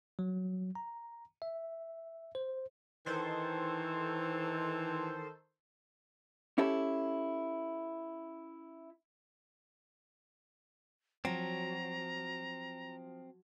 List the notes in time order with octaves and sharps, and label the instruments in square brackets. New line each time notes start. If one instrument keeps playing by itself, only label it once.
[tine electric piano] F#3
A#5
E5
C5
[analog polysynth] D#3 A4 C5 [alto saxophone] E3
[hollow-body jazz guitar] C#4 E4 G4 A4
[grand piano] F3 [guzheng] F#3 [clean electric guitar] C4 [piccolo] A#5